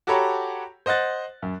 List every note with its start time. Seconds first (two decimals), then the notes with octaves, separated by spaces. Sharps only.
0.07 F#4 G4 A4 C#5 A#5 B5
0.86 C5 D#5 F#5 F#6 A6
1.42 F#2